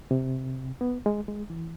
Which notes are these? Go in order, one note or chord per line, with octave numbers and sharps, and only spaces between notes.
C3
B3
G#3
G#3
E3